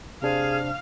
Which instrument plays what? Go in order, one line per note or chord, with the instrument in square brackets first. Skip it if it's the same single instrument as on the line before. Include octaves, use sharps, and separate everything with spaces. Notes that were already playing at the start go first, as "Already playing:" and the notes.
[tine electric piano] C3 D4 C5 [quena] G#4 [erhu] F5